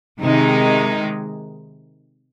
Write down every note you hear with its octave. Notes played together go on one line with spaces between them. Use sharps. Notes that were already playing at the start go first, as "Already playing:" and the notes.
C3 D#3 G#3 D#4